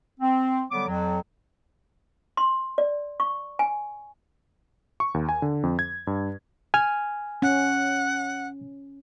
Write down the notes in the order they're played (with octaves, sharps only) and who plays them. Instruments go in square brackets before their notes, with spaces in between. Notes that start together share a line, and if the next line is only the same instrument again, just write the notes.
[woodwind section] C4
D3 F#3 G3 B3 D6
F2 F#3
[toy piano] C6
D5
C#6
G#5
[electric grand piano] C#6
D#2
G#5
D3
F2
G#6
G2
[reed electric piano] G#5 F6
[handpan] C#4 [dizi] F#5